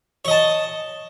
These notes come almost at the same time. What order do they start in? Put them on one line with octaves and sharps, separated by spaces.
C#5 D#5 A5